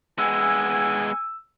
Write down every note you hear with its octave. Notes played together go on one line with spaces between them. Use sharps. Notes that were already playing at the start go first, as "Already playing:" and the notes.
G#3 B3 G#5 E6